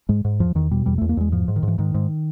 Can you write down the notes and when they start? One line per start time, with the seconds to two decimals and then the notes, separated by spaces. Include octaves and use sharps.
0.09 G#2 G#3
0.25 G#2
0.40 E2 F3
0.55 E2 D#3
0.71 B2 G3
0.86 E2 G3
0.98 A3
1.01 E2
1.09 A#3
1.17 E2 G#3
1.32 G#2 F3
1.48 G#2
1.56 D#3
1.63 G#2 E3
1.78 G#2 D#3
1.94 G#2